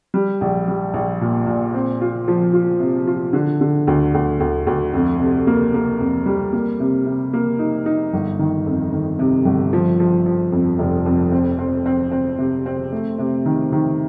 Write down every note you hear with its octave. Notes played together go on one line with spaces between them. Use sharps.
G3
A#1
G3
A#1
A#2
A#2
C4
F4
F3
F4
C3
F4
D3
D3
D2
D2
D2
D2
F2
C3
A#3
A#3
F2
G3
A#3
C3
C3
A#3
D#4
D#4
G1
D#3
F2
D#3
C3
G1
F3
F3
F3
F2
F1
F2
C4
C4
C4
C4
C3
C4
A3
C3
D#3
D#3